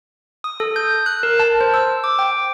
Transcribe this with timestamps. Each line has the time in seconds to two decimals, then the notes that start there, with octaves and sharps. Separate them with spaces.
0.44 D#6
0.60 A4
0.76 G6
1.06 F#6
1.23 A#4
1.39 A5
1.61 C5
1.74 E6
2.04 D6
2.19 G5